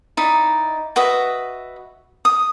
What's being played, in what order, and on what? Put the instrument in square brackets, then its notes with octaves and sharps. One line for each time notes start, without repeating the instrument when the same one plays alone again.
[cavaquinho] D#4 E4 D5
F#4 B4 D#5 E5
D#6